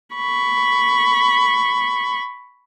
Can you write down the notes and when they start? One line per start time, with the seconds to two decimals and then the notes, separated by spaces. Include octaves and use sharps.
0.15 B5 C#6